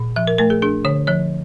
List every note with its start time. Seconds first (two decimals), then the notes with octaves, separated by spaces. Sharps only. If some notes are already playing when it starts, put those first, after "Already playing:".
Already playing: A#2
0.16 F3 E5
0.27 A#4
0.38 A3 A#4
0.50 G#4
0.62 D4 G#4
0.85 D3 C#5
1.07 F3 C#5